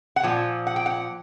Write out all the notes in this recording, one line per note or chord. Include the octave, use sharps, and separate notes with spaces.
F#5
A#2 F3
F#5
G5
F#5